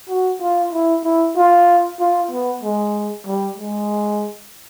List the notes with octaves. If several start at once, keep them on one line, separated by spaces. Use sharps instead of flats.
F#4
F4
E4
E4
F4
F4
B3
G#3
G3
G#3